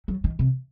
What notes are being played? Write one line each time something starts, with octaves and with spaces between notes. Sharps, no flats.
F#3
D#3
C3